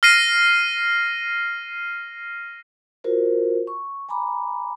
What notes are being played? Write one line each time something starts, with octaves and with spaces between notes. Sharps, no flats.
F6 A#6 C7 D#7
F4 F#4 A#4 C5
C#6
G#5 A#5 B5 D6